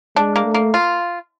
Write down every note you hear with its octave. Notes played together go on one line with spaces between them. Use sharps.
G#3 D4
A#3
A3
A#3
F4